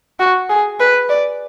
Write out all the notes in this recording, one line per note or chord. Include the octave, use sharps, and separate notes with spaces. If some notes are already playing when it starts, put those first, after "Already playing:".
F#4
G#4
B4
D5